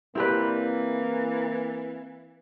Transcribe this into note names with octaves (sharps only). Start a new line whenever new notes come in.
E3 A#3 C4 E4 G4 B4 D5